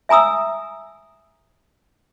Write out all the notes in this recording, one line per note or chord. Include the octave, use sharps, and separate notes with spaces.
E5 G#5 A#5 D#6 E6